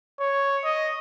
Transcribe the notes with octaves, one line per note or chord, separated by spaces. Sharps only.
C#5
D#5